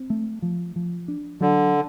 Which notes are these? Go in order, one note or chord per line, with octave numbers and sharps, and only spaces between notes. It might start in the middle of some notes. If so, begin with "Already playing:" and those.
Already playing: C4
A3
F3
F3
D4
D3 F#3